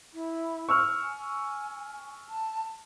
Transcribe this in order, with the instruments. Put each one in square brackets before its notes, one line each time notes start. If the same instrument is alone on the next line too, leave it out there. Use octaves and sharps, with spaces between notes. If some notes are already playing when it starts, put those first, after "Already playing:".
[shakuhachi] E4
[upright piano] C#6 E6 F6
[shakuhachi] G#5
A5